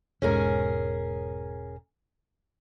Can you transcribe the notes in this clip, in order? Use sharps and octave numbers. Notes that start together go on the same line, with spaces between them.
E1 G#2 C#4 G#4 A#4